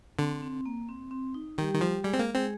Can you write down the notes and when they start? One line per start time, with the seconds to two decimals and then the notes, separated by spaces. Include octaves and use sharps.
0.19 D3 C4
0.42 C4
0.66 A#3
0.89 C4
1.11 C4
1.34 D#4
1.58 D#3 G3 G4
1.74 D#3
1.81 F3
2.04 G3 G#3 G#4
2.13 C4
2.19 A#3
2.35 G#3 C4 G#4